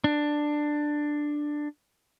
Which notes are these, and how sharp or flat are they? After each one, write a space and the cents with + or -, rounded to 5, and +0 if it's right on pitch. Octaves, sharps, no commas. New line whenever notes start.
D4 +10